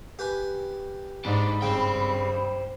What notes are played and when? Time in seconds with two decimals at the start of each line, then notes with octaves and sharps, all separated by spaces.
0.19 G4 B4 G#5
1.25 G#2 D4 D#4 B5
1.62 G2 C#3 C5 G5